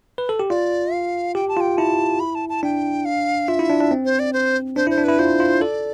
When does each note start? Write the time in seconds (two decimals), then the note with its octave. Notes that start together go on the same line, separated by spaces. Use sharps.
0.18 B4
0.29 A4
0.40 G4
0.50 F4 D5
0.93 F5
1.35 G4 G5
1.49 A5
1.57 F4 G5
1.77 E4 A5
2.20 B5
2.35 A5
2.49 A5
2.63 D4 G5
3.05 F5
3.48 F4 E5
3.59 E4
3.70 D4
3.81 D4
3.91 C4
4.05 C5
4.19 D5
4.33 C5
4.76 D4 C5
4.87 E4 C5
4.98 D4
5.04 E4 B4
5.19 F4 C5
5.40 F4
5.61 A4 D5